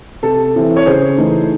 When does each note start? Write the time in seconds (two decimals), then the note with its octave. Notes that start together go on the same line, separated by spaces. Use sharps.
0.23 C3 A4
0.55 E3 C4 E4
0.76 C#5
0.86 C#3 G#4 C5
1.18 E3 A3 D#4